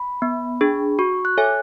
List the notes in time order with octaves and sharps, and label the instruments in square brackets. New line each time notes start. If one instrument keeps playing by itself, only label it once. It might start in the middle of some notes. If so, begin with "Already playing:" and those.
Already playing: [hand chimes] B5
[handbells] B3
D4 G#4
[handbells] F#4 [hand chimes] C#6
[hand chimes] F#6
[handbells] A4 C#5 E5 G#5